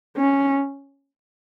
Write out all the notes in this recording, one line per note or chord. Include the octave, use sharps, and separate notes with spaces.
C#4